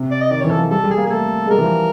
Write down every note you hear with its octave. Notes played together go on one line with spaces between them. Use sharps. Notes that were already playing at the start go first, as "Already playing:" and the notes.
Already playing: C3
D5
D#5
D#3 D5
E3 C#5
A4
F3
G3 A4
G3
G#4
A#3
G#4
A3 A4
G#3
G3 A#4
E3
F3